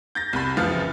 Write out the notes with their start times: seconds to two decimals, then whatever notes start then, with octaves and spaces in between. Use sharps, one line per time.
0.15 G6 A6 A#6
0.33 C2 B5
0.57 F#1 E3 F3 F5 F6 A6